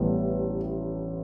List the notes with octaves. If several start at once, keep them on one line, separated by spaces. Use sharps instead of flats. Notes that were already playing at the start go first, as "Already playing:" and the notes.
Already playing: A1 A2 G3 B3